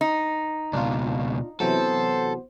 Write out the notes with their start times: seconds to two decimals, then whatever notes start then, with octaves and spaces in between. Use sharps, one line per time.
0.01 D#4
0.73 C#2 B2 D4 F4
1.60 C3 E3 F#3 B3 A4 C5